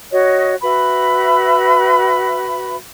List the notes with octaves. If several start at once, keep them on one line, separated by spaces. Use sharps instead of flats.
F#4 C#5 D#5
F#4 B4 E5 B5